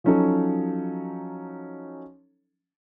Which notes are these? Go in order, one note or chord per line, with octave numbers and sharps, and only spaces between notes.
F3 F#3 C#4 D#4 A4 C#5